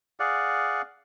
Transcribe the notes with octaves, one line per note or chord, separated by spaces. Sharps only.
G#4 D5 F5 F#5